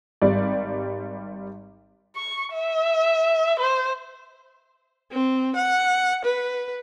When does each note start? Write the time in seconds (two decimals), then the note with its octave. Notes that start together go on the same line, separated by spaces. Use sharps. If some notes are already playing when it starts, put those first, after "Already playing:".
0.22 G#1 G3 D5
2.16 C#6
2.53 E5
3.60 C5
5.11 C4
5.56 F#5
6.25 B4